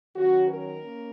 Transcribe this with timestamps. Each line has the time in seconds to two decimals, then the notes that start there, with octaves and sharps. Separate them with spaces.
0.15 D#3 F#3 C#4 F#4
0.47 A#4
0.80 A#3 C#4